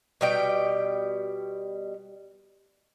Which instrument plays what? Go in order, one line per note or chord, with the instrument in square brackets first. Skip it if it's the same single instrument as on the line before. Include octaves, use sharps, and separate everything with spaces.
[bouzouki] B2 G3 G5